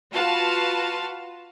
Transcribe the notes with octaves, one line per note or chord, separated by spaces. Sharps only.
F4 F#4 B4 F5 A5